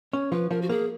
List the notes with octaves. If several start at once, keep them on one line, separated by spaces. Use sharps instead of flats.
C#4 C#5
F3 B4
F3 A#4
F#4
A#3 G#4